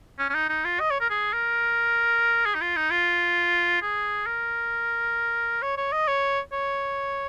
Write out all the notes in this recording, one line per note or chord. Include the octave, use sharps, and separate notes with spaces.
C#4
C#4
D#4
D#4
F4
D#5
C#5
A#4
G#4
A#4
G#4
D#4
F4
D#4
F4
G#4
A#4
C#5
C#5
D#5
C#5
C#5